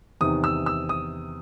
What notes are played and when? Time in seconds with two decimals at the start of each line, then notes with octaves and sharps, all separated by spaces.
0.21 E2 C3 D#3 D#6
0.44 E6
0.66 E6
0.89 D#6